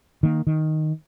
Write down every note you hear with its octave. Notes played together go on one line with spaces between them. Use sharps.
D#3 A#3
D#3